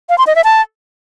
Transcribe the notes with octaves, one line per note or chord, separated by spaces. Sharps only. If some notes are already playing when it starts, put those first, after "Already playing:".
F5
C6
D#5
E5
A5